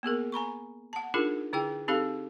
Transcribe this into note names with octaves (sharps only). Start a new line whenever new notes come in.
A#3 B3 G#4 A#4
G#5 A#5 B5 C#6
F#5 A5
D4 D#4 F4 G#4 A#4
D3 E4 G#4 G5
C4 D#4 G4 A4 F5